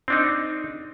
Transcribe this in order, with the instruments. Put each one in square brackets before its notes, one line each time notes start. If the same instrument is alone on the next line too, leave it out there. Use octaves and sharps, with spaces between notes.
[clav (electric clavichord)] C4 D4 D#4